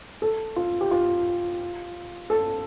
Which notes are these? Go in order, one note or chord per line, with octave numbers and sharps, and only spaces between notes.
A4
F4
G4
F4
A4